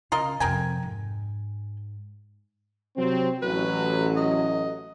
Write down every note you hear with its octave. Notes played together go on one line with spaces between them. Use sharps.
C#3 F4 A#4 D#5
F2 C3 A#4 G5 G#5
G#2
C3 F#3 C4
A1 F#3 B4
D#5